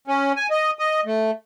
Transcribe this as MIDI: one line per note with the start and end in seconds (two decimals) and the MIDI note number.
0.08 0.32 61
0.36 0.47 80
0.51 0.70 75
0.79 1.01 75
1.06 1.31 57